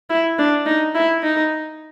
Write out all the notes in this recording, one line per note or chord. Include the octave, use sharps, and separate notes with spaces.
E4
D4
D#4
E4
D#4